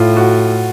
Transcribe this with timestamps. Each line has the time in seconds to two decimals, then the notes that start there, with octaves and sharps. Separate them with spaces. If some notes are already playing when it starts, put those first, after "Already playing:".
Already playing: A2 F4
0.17 F#4